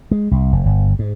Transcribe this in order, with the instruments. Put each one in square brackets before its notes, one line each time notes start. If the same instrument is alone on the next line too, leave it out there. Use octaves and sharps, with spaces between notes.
[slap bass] G#3
C2
F1
G1
G#2